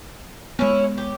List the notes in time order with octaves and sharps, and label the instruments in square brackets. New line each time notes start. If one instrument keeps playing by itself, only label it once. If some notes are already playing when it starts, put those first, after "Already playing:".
[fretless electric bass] G#3 B3 [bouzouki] C#4 E4
[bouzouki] G4